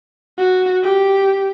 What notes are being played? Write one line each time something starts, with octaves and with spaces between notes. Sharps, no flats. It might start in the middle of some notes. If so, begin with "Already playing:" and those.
F#4
G4